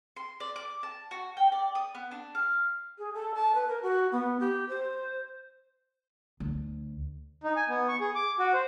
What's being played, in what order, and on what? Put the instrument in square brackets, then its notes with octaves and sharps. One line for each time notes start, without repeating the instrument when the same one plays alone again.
[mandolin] C6
D5
D6
A5
F#4
G5
D5
D#6
B3
D4
F5
[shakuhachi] G#4
A4
A5
B4
A#4
F#4
B3
G4
C5
[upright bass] D2
[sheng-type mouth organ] D#4
G#5
B3
C#6
G#4
D6
F#4
C5